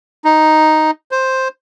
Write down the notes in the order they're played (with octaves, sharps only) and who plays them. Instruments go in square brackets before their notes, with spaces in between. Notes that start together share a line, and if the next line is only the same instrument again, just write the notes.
[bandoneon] D#4
C5